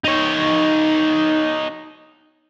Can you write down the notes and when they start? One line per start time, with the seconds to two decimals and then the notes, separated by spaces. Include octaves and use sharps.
0.04 D#4 C#5